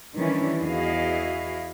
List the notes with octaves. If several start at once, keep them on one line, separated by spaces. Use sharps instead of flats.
D#3 E3 G3 C#4 D4 E4
E2 E4 F#4 G#4 D#5 F5